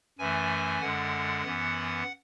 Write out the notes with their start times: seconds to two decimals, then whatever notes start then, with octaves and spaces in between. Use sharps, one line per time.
0.19 F#2 E3 A3 G#5
0.81 F#2 D3 G#3 F#5
1.44 F#2 E3 B3